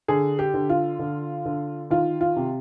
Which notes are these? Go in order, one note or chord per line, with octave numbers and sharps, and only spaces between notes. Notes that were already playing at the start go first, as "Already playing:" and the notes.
D3 G#4
G4
D3
F4
D3
D3
D#3 F4
F4
C3